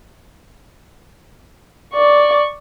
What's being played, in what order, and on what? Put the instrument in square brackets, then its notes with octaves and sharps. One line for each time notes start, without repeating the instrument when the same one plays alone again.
[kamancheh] D5 C#6